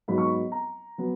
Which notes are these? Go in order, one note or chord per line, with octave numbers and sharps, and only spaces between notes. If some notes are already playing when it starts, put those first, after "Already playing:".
G#2 F#3 B3 B5
C#6
B5
A#5
F#3 B3